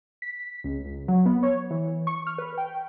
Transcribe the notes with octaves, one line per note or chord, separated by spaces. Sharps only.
B6
C#2
C#2
F#3
B3
C#5
E3
C#6
F6
B4
G5